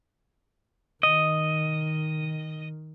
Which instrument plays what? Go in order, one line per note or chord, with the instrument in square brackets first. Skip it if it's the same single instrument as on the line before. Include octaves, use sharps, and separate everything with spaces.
[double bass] D#3 [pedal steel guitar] D#5